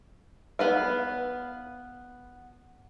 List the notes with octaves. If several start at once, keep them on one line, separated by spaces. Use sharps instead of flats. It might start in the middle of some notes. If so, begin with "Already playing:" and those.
B3 B4 F5